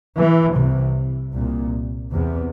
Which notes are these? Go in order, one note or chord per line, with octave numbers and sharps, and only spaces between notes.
E3
C2 C3
C2 A#2
E2 C3